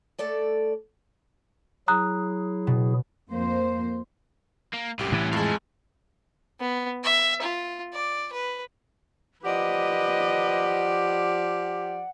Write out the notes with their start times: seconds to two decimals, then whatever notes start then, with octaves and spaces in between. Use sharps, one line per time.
0.19 A3 A4 D5 A5
1.88 F#3 E4 G#4 A#5 D#6 F#6
2.67 B2
3.30 F2 A#3 C5
4.74 A#3
4.99 C2 F#2 A2 G4
5.12 A2 E3 C#4 B4
5.33 F2 G#3 F5 A5
6.60 B3
7.04 E5
7.42 F4
7.93 D5
8.33 B4
9.44 F3 G4 B4 D5 D#5 F#5